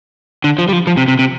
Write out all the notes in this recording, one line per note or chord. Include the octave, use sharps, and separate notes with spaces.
D3
F3
G3
F3
F3
C3
C3
C3